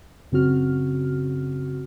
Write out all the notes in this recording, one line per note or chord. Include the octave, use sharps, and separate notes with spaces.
F#2 C#3 C4 F#4 F6